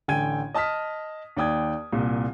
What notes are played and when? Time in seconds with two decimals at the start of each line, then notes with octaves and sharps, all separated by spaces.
0.08 A1 D3 G5 G#5 G#6 D#7
0.54 D#5 A5 D#6 F6 B6
1.37 D#2 D5 G5 D#6 G#6
1.93 C2 A#2